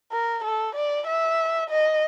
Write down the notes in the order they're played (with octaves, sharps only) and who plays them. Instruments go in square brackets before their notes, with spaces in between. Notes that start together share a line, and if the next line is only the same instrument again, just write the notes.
[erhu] A#4
A4
D5
E5
D#5